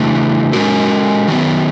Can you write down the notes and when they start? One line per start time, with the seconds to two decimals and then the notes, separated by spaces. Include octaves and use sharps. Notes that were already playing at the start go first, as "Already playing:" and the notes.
Already playing: C#3 E3 A3 D4
0.53 G#3 C#4 F#4 A#4
1.28 D#3 F#3 B3